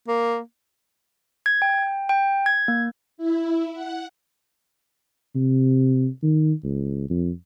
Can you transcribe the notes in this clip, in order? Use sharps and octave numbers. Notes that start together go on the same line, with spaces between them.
A#3
G#6
G5
G5
G#6
A#3
E4
F#5
C3
D#3
C#2
F2